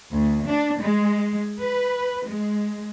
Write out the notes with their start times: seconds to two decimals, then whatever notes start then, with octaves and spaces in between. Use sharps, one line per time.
0.11 D2
0.46 D4
0.83 G#3
1.59 B4
2.26 G#3